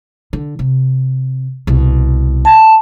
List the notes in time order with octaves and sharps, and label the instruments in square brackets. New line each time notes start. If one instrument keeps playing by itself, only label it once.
[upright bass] D3
C3
C2 B2
[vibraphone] A5